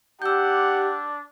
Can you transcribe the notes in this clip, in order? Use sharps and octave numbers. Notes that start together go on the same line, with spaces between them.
D4 G4 F#5 E6 G6